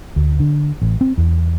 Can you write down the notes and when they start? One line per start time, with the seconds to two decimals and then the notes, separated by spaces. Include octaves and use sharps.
0.16 D2
0.40 D3
0.82 A1
1.01 C4
1.18 E2